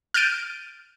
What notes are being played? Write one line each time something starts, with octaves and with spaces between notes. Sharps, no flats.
F6 G6 A6 D7 D#7